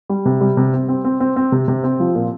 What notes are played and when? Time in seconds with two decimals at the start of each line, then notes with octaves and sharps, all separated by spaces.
0.09 G3
0.26 C3
0.41 G3
0.57 C3
0.73 C4
0.89 C4
1.04 C4
1.20 C4
1.36 C4
1.52 C3
1.68 C3
1.84 C4
2.00 F3
2.15 A#2